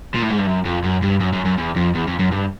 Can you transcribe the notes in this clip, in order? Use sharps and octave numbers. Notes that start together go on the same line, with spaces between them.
A#2
A2
G#2
G2
F#2
F2
F#2
G2
F#2
F#2
F#2
E2
F2
E2
F2
F#2
G2